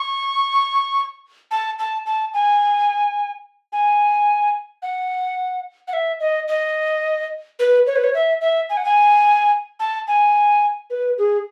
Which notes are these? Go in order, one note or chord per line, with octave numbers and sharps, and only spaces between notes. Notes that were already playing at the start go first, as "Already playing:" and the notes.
Already playing: C#6
A5
A5
A5
G#5
G#5
F#5
F#5
E5
D#5
D#5
B4
C#5
B4
C#5
E5
E5
G#5
F#5
G#5
A5
G#5
B4
G#4